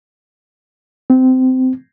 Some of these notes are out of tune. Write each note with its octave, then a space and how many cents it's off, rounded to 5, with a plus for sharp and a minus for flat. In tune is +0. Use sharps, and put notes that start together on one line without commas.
C4 -20